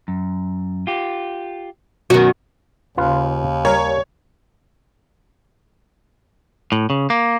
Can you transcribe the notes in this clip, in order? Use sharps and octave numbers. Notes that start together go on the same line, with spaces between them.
F#2
F4 G4
F#2 B2 D#3 C#4 F#4
D#2 C#3 F4 B4 F5
G3 A#4 C#5
A2
C#3
A#3